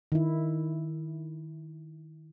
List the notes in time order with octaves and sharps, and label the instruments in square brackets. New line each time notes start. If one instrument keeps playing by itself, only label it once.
[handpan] D#3 E4